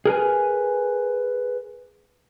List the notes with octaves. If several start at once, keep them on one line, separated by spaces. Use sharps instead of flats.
G#4 A#4 B4 G#5